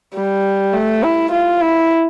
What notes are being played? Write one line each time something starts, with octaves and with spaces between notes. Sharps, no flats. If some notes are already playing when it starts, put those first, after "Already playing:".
G3
A3
E4
F4
E4